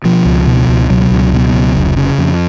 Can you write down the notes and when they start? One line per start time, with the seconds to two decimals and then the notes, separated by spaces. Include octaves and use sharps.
0.04 B2 F3
0.26 C#2
0.47 B2
0.69 C#2
0.90 B2 F#3
1.11 C#2
1.33 B2
1.54 C#2
1.76 F1
1.96 C#3
2.18 F2